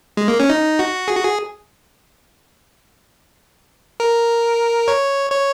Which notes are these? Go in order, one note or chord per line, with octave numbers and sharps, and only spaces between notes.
G#3
A#3
C#4
D#4
F#4
G#4
F#4
G#4
A#4
C#5
C#5